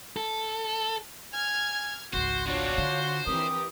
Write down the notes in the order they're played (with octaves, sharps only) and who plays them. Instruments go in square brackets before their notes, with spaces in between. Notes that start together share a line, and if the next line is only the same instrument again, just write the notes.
[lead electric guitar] A4
[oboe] G#5 [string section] F6 G#6
[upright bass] G#1 C#2 [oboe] F#4 [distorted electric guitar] C5 [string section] C6
[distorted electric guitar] B2 C4 [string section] D4 F4 C#5 [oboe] F#4
[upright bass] D3 [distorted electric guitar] C5
[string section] E3 G4 A#4 [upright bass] C4 [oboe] D#6